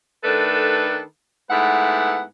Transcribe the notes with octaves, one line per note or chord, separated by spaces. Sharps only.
D#3 A3 D4 A4 B4
G#2 A3 B3 E4 B4 F#5